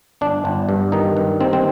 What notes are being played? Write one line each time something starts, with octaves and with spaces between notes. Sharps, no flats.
G1 D4
G1
G2
D#3 D#4
G2
D#3 C4
C4